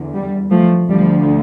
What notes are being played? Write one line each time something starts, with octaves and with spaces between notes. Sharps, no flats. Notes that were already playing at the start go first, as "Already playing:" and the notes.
Already playing: E2 D3
G3
F3 A3
D2 D3 F3 G3